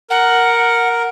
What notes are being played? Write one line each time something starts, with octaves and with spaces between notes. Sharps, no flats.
A#4 F#5